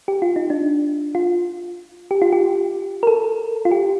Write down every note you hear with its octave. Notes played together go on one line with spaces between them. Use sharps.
G4
F4
D#4
D4
F4
G4
F4
G4
A#4
A4
F4
G4